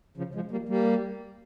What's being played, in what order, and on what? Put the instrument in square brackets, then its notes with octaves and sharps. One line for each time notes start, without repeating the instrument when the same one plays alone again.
[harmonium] C#3 F3
F3 G#3
G3 A#3
G3 A#3